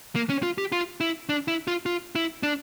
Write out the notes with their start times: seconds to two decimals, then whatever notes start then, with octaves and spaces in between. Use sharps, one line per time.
0.16 A#3
0.29 C#4
0.43 F4
0.58 G4
0.72 F4
1.00 E4
1.29 D4
1.48 E4
1.67 F4
1.86 F4
2.15 E4
2.43 D4